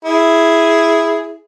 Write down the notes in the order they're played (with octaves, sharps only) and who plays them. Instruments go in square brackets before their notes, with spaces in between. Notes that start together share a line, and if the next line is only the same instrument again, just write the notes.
[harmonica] E4 G#4